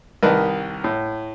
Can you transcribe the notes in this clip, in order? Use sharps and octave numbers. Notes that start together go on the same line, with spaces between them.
C2 D#3 A#4 B4 D#5 A5
A2